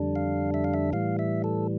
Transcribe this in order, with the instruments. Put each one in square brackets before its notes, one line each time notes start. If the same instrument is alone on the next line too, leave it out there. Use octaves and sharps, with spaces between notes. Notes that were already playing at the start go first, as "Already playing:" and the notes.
Already playing: [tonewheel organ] F2 D3 G3 D4
F5
E5
F5
E5
A2 E3 G3 F5
E5
A4